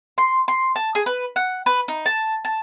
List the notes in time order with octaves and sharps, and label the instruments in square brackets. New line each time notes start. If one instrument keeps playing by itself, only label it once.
[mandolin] C6
C6
A5
G#4
B4
F#5
B4
D#4
A5
A5